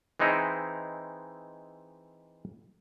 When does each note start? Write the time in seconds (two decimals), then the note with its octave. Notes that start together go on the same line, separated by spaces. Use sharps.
0.20 E3 G#3 C4 D#4 E4